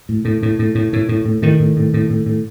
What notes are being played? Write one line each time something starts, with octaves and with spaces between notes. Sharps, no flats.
A2
A2
A2
A2
A2
A2
A2
A2
A2 D#3
A2
A2
A2
A2
A2